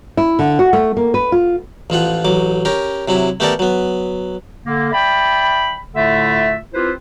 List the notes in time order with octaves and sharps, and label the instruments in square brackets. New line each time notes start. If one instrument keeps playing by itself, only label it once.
[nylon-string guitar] E4
D3
F#4
A3
A#3
B4
F4
[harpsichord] A1 F3 F4 F#5
A1 F#3 D6
C#4 G4 A#4
C3 F#3 E4
A3 B3 G4 A4 A#4 D5
F#3 B3
[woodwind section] D3 A#3
D5 E5 G5 B5
A2 D3 A3 F4 E5
C4 E4 F4 G4 B4 C5